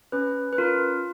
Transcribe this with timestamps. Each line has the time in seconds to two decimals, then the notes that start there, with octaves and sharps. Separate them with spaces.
0.12 C#4 B4
0.53 B4
0.58 F4 A#4